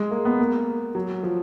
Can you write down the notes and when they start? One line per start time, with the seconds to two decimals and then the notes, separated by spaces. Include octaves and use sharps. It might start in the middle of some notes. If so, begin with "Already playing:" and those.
Already playing: G#3
0.11 A#3
0.25 B3
0.39 A#3
0.95 F#3
1.23 F3